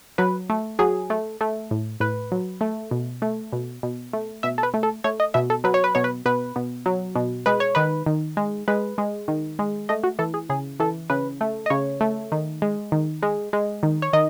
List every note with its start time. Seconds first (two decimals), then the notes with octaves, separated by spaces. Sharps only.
0.18 F#3 B4
0.50 A3
0.79 F#3 G#4
1.10 A3
1.41 A3
1.71 A2
2.00 A2 B4
2.32 F#3
2.61 A3
2.91 B2
3.22 A3
3.53 B2
3.83 B2
4.13 A3
4.43 B2 E5
4.58 A4
4.63 B4
4.74 A3
4.83 A4
5.04 A3 C#5
5.20 D#5
5.34 B2 E5
5.50 A4
5.64 F#3 B4
5.74 C#5
5.84 B4
5.95 B2 C#5
6.04 B4
6.26 B2 B4
6.56 B2
6.86 F#3
7.16 B2
7.46 G#3 B4
7.60 C#5
7.75 D#3 B4
8.06 D#3
8.37 G#3
8.68 G#3 B4
8.98 G#3
9.28 D#3
9.59 G#3
9.89 A3 D#5
10.04 F#4
10.19 E3 A4
10.34 G#4
10.50 C#3 G#4
10.80 E3 A4
11.10 C#3 B4
11.41 A3
11.66 D#5
11.70 C#3 C#5
12.01 A3
12.32 D#3
12.62 G#3
12.92 D#3
13.23 G#3
13.53 G#3
13.83 D#3
14.02 C#5
14.13 D#3 D#5